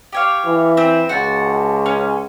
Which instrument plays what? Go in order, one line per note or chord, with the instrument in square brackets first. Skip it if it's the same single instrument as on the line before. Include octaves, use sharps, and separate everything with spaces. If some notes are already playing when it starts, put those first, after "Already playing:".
[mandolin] G4 C#5 F5
[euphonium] E3
[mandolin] C4 E5
[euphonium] C#2 [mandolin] F#4 A5
[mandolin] C#4